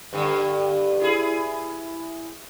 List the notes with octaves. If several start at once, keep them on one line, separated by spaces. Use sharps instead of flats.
G2 D3
E4 G#4